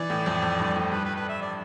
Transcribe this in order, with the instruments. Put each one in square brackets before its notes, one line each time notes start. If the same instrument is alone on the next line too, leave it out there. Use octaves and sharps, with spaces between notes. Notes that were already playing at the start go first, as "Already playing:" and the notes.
Already playing: [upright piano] E3 [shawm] D5
[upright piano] A2
F2
F2
G2
A2
[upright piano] G2 [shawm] B4
[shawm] B4
B4
E5
D5